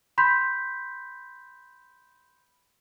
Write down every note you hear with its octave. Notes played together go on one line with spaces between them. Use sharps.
B5 C6 G6 B6